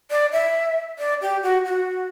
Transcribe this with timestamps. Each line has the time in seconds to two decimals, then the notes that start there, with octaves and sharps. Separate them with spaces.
0.11 D5
0.32 E5
0.99 D5
1.22 G4
1.43 F#4
1.65 F#4